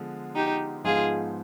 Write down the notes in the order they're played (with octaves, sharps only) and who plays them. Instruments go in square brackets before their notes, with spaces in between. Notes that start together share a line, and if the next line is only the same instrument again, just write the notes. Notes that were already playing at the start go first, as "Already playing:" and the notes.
Already playing: [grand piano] D3 F3 G#3 B3
[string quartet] D#4 G4
[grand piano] G#2 F3 B3 D#4 [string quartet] F4 G#4